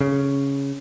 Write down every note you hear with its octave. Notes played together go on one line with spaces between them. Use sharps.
C#3